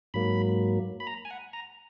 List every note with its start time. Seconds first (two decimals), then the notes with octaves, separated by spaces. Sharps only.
0.14 G#2 F#3 A#3 B5
1.00 B5
1.07 A#5
1.25 G#5
1.31 F#5
1.53 A#5